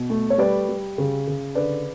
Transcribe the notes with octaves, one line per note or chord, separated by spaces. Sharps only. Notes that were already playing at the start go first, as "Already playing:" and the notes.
Already playing: B2
A3
C#5
G3 B4 D5
G3
C#3
C#3
D3 B4 D5